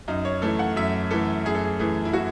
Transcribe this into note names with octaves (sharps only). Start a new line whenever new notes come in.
F#2 D#4
C#5
E3 A3 A4
F#5
F#2 E5
E3 A3 A4
F#2 G#4
A4
G#4
E3 A3 G#4
E4
F#4